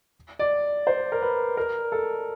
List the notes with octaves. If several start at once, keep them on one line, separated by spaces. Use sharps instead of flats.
D5
C5
A#4
B4
A#4
A4